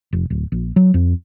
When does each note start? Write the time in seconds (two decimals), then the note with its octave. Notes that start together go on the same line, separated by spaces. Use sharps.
0.13 F1
0.30 D1
0.52 A#1
0.76 F#3
0.94 F2